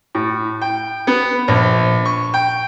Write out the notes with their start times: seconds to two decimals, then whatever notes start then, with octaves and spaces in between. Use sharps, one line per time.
0.15 A2
0.62 G5
1.07 B3
1.48 A#1
2.05 C#6
2.34 G5